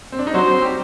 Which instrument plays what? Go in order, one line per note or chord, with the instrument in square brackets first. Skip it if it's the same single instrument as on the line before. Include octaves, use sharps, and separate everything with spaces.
[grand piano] C4
D4
D#4
[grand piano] F#3 F#4 [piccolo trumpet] C5
[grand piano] C4
G3 G4